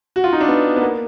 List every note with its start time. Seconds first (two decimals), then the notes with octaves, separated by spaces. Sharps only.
0.16 F#4
0.24 F4
0.33 D#4
0.41 D4
0.48 B3
0.76 B3
0.82 A#3